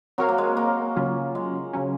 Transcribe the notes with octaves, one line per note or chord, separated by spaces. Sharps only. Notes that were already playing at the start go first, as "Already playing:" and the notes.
F#3 C4 F#4 A#4 C#5 F5
A#3
G#3
A#3
C#3 F#3 C#4 F4
G#3
C#3 F#3 C#4